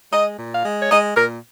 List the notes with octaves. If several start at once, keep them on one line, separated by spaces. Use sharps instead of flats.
G#3 D#5
A#2
F5
G#3
C#5
G#3 D#5
A#2 A#4